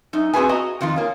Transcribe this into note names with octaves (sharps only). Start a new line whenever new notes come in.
F#2 D#4
B3 C4 F#4 G#4 B4 G#5
F#4 D#5 G#5 A#5
F2 D#3 D#4 F4
A#3 C#4